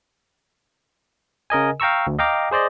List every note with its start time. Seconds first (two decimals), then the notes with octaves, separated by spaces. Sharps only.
1.50 C#3 A#4 D#5 G#5
1.80 F5 G5 A#5 C#6 E6
2.07 D2
2.19 D#5 F5 G5 A#5 D6
2.51 G#4 C5 D5 D#5